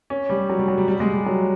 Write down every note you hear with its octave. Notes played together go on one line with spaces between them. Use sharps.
C#4
G3
F#3
G3
F#3
G3
G3
G#3
G3
F#3